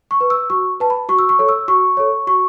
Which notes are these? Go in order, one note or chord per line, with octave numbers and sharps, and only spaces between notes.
C#6
B4
E6
F#4 C#6
B4 A5
B5
F#4 C#6
E6
C#6
A4 C#5
E6
F#4 C#6
A4 C#5
F#4 C#6